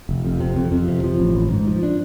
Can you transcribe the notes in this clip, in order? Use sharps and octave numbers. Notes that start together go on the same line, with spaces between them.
F1
F2
C3
F2
F2
C3
F3
A1
A1
G#2
F3
D4